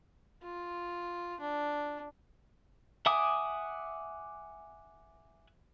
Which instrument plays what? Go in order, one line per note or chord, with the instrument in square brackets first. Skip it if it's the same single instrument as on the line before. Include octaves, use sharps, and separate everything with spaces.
[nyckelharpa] F4
D4
[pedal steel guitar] E5 F#5 G#5 D6 D#6